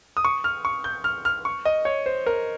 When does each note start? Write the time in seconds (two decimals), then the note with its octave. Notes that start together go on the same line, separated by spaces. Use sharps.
0.17 D#6
0.25 C#6
0.44 F6
0.65 C#6
0.84 G6
1.04 F6
1.25 F6
1.45 C#6
1.65 D#5
1.85 C#5
2.06 C5
2.26 A#4